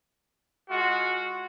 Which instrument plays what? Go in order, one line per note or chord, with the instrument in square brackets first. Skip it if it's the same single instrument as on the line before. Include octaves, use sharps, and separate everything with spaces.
[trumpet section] G#3 F4 F#4